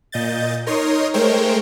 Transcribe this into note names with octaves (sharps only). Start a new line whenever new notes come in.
A#2 D#5 G6 A6
D#4 A#4 C#5 C6 D#6
G#3 A3 A#4 C5 C#5 G5